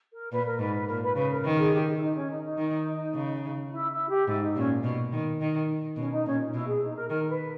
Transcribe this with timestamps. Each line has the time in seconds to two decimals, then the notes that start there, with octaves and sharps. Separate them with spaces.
0.13 A#4
0.31 A#2 B4
0.46 A#4
0.59 G#2 B4
0.74 B4
0.88 A#2 A#4
1.02 B4
1.16 C#3 B4
1.31 A#4
1.45 D#3
1.59 G#4
1.73 G4
1.94 E4
2.01 D#4
2.15 C#4
2.29 D#4
2.43 D#4
2.58 D#3
3.14 C#3
3.71 E4
3.90 E4
4.08 G4
4.27 G#2 E4
4.42 D#4
4.56 A#2 C#4
4.83 B2
5.12 D#3
5.41 D#3
5.96 B2 C#4
6.11 D#4
6.26 A#2 C#4
6.40 D#4
6.53 B2 E4
6.67 G#4
6.82 D#4
6.95 A#4
7.10 D#3 A#4
7.29 B4